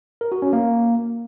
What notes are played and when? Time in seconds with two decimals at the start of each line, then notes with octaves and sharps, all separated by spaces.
0.21 A#4
0.32 F#4
0.42 C#4
0.53 A#3